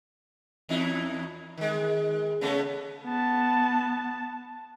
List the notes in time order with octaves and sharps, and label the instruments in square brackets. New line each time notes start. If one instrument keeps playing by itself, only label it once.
[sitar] E2 D#4 E4
D#3 G#3
C#3 A3 B3
[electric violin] B3 A5